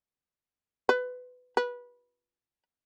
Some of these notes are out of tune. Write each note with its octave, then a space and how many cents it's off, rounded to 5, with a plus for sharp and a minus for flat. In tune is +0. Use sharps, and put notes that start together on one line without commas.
B4 +20
B4 -20